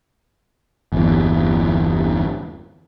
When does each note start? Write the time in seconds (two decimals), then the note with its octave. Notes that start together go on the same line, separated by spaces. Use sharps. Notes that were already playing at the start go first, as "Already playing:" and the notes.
0.92 G1 E2